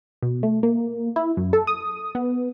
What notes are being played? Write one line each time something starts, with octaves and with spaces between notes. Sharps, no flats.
B2
A3
A#3
E4
F#2
A4
D#6
B3